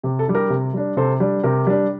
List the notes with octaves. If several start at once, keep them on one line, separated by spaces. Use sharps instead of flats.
C3 G4
A4
G3 D4
G4 A#4
C3
G3 D4
C3 A4 C5
G3 D4
C3 G4 A#4
G3 D4